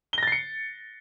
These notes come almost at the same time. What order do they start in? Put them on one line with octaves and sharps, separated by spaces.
G7 A#6 A6 C7 C#7